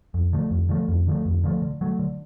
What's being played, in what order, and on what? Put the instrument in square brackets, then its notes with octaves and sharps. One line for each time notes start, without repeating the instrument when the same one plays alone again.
[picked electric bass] F2
D3 F3 A3
F2
D3 F3 A3
F2
D3 F3 A3
F2
D3 F3 A3
D3
F#3 A3
D3